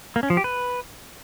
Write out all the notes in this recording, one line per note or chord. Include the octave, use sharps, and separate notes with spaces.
A#3
C#4
F3
G4
B4